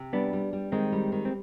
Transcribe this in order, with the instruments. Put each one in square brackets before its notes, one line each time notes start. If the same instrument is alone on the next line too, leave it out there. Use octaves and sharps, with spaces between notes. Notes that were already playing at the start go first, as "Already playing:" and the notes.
Already playing: [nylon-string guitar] C3
[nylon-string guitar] G3 [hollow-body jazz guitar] B3 D4
[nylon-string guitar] G3
G3
[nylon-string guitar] D#3 [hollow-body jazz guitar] G#3 C4
[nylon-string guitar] G3
D#3
[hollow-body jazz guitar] C4